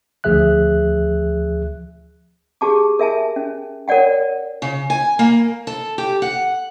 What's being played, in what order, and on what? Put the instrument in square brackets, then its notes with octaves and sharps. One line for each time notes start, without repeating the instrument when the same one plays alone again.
[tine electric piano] D2 F3 G#4 E5 F#6
[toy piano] G4 G#4 A5 D6
A#4 E5 G#5 A5
C#4
A#4 C#5 D5 F#5 G5
[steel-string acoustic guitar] C#3
G#5
A#3
A4
G4
F#5